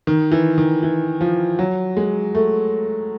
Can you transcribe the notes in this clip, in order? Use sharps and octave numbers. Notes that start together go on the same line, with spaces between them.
D#3
E3
D#3
E3
F3
F#3
G#3
A3